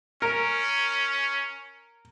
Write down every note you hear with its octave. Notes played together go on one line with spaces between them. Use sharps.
C#4 A#4